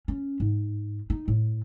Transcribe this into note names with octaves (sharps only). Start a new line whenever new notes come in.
C#4
G#2
D#4
A2